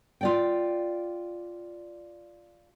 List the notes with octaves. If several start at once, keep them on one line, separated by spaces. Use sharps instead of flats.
F4 D5 G5